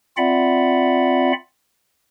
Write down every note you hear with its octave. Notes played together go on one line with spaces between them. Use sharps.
C4 F4 D5 E5 F#5 B5